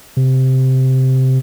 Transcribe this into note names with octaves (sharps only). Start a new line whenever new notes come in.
C3